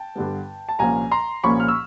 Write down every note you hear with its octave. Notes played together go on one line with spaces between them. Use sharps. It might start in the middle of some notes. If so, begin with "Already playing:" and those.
Already playing: G5 A5
G2 D3 G3 B3
A5
C2 A#2 F3 A#3 C#4 G#5 A#5
A#5 C6
C2 A#2 F3 A#3 C#4 B5 C#6
F6
E6